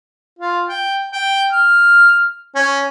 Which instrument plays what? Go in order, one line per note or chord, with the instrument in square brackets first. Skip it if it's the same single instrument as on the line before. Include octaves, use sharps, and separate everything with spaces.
[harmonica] F4
G5
G5
F6
C#4